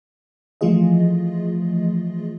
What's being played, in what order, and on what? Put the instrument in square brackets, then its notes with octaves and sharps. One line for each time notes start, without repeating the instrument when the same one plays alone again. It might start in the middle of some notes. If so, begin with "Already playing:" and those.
[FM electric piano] E3 F3 A3 F4 G#4 D#5